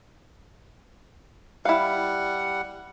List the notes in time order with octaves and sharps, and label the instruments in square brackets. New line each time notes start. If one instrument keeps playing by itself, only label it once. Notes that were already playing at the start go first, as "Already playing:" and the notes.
[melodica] G3 F#5 [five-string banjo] E4 F5